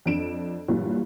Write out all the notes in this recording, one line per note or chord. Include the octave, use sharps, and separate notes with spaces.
F2 D4 D7 E7
G2 A#2 E3 F#3 G3